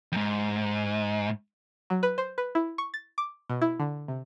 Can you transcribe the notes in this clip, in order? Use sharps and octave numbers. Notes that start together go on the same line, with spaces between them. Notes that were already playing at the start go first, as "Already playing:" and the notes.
F2 G#2
F#3
B4
C5
B4
E4
C#6
A6
D6
B2
E4
D3
C3